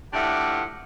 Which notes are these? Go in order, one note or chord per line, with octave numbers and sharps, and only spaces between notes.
A2 D4 F4 G4 E5 F#5